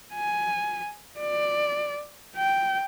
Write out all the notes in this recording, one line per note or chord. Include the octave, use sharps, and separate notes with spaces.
G#5
D5
G5